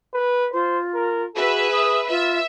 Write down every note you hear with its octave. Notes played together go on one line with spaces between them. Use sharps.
B4
F4 C5
A#4
F#4 G#4 B4 E5
D#6
F4 E5